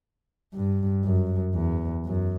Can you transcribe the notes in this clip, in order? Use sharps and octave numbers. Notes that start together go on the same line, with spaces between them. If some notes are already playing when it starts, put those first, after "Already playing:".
G2
F#2
E2
F#2